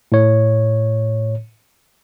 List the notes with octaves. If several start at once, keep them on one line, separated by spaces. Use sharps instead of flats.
A2 C#5